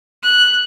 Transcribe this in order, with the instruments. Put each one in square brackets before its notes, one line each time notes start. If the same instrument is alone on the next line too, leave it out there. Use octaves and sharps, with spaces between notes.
[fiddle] F#6